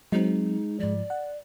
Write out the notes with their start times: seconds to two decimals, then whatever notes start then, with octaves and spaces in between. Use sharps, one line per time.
0.12 F#3 G#3 C4 D#4
0.80 G#2 F3 D5
1.10 F#5